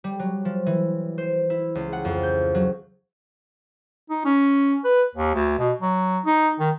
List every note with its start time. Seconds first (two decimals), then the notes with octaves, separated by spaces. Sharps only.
0.04 G3
0.19 F#3
0.45 F3
0.66 E3
1.18 C5
1.50 E4
1.75 C#2
1.93 F#5
2.05 F2
2.23 G6
2.55 F#3
4.10 D#4
4.25 C#4
4.84 B4
5.15 D#2
5.35 D2
5.59 B2
5.81 F#3
6.26 D#4
6.60 D#3